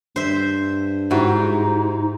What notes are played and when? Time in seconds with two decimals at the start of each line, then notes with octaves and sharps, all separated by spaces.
0.16 G2 C5 E5
1.11 G#2 D#4 E4 F#4 G4